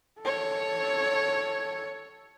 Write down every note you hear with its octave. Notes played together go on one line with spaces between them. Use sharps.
A4 C#5